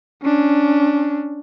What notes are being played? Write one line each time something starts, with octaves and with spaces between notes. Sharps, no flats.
C#4 D4